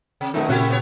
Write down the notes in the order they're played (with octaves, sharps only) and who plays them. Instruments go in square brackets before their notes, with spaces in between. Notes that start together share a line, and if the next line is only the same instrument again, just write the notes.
[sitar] C3
[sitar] F2 B2 D#4 [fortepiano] D#3 A3
[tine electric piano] A#2 C#3 [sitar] A3 E4 G4 [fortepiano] C#4 F#4 A#4
[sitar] A3 B3 C#5